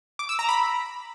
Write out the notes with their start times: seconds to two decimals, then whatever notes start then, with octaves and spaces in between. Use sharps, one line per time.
0.19 D6
0.29 E6
0.39 A#5
0.49 B5